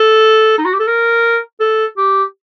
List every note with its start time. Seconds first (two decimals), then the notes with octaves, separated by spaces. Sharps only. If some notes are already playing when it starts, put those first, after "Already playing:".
Already playing: A4
0.58 D#4
0.65 F#4
0.73 G4
0.79 A4
0.87 A#4
1.60 A4
1.97 G4